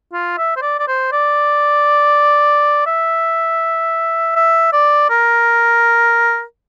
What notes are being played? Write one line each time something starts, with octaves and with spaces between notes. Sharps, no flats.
F4
E5
C5
D5
D5
C5
D5
E5
E5
D5
A#4